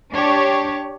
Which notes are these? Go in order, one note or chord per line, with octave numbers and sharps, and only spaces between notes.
D4 G4 C#5